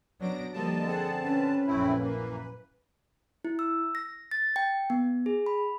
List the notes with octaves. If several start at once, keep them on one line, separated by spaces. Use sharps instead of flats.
B2 F#3 D4 A#6 D7
D3 F3 G3 A#3 D#5 A5
C4 G#4 F#5
C#4 B4
A#1 F#2 A3 C4 E4
E3 A#3
E4
E6
A#6
A6
G5
B3
G#4
B5